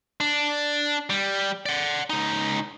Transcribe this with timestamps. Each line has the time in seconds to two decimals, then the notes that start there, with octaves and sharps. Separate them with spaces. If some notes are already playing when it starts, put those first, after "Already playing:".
0.20 D4
1.10 G3
1.66 D5 F#5
2.10 C#2 D#4